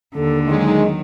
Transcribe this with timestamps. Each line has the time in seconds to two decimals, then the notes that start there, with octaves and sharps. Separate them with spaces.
0.15 D#2 D3 A4
0.48 D#3 F#3 G#3 D#4